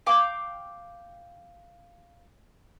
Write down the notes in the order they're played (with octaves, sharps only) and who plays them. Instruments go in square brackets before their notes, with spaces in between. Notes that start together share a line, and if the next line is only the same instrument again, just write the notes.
[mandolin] F5 G5 D6